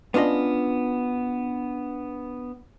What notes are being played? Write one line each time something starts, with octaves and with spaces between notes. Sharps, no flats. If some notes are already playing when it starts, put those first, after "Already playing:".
B3 C#4 D4 F4 D#5